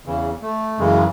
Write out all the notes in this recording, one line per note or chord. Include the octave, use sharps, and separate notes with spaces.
E2 C#3 E3
A3
F#2 C#3 E3 G#3